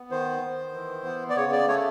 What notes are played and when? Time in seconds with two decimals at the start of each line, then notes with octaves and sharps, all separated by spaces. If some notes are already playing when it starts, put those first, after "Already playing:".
Already playing: B3
0.11 D#3 C5
0.42 D#3
0.73 E3
1.05 B3
1.30 D5
1.36 C#3 C#5
1.52 D5
1.68 A3 C#5